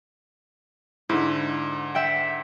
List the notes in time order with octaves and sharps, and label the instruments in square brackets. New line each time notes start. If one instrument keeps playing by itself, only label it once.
[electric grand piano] G#2 D3 [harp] E4
[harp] E5 F#5 G5